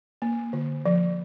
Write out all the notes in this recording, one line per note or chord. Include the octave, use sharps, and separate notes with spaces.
A#3
D3
F3